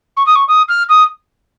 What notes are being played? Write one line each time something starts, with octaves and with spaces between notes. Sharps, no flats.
C#6
D#6
C#6
D#6
F6
D#6